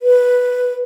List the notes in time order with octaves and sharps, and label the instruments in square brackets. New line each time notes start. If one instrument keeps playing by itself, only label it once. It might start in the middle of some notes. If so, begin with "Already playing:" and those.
[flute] B4